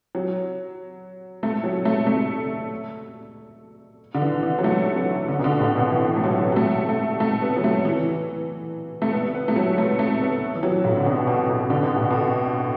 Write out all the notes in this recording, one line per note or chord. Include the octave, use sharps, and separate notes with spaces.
F#3
A3
F#3
A3
A3
D3
E3
E3
F#3
A3
F#3
D3
B2
D3
A2
B2
E3
A3
F#3
F#3
A3
A3
A3
B3
F#3
A3
E3
A3
B3
B3
A3
F#3
A3
A3
B3
E3
F#3
A2
D3
B2
B2
B2
D3
B2
A2
B2